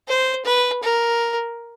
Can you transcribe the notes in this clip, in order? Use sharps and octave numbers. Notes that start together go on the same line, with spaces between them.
C5
B4
A#4